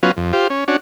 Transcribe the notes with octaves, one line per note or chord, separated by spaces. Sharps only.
F#3 B3 C#4 F4
F2
F4 G4 C5
C#4
C#4 D4 F#4